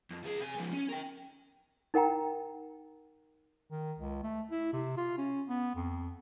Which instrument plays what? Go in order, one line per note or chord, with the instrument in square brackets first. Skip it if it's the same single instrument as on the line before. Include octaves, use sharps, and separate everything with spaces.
[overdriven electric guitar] F2
C#2 G#4
C3 G#5
C#2 F3
C#4
A#4 G5
[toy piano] D#4 A#4 F#5 G5 A#5
[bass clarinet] D#3
C#2
A3
E4
C3
F4
C#4
B3
F2